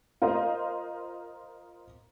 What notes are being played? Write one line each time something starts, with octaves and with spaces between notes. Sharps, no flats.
F4 A#4 C5 D#5